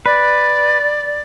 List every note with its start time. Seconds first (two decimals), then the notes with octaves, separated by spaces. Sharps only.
0.06 B4 D5